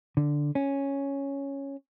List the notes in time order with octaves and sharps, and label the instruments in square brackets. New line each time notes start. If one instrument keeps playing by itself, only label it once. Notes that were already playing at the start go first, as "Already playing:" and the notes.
[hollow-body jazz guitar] D3
C#4